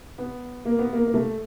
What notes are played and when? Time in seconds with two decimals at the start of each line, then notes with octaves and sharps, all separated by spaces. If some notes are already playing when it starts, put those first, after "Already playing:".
0.18 B3
0.65 A#3
0.79 B3
0.93 A#3
1.07 A#3
1.14 A3